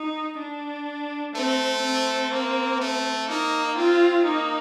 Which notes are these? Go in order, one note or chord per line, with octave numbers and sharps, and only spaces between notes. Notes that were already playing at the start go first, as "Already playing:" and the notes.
Already playing: D#4
D4
A3 C4
C4
A#3
A3
A#3 D#4
C4 F4
A#3 D#4